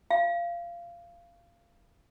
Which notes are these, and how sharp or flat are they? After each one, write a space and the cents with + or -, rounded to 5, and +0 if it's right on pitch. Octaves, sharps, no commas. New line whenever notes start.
F5 -20